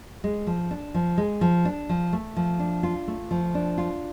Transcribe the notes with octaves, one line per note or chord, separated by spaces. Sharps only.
G#3
F3
D4
F3
G#3
F3
D4
F3
A3
F3
D4
F4
A3
F3
D4
F4